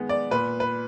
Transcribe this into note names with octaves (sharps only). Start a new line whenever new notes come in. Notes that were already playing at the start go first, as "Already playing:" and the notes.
Already playing: D#3 G#3 B3
D5
A#2 B4
B4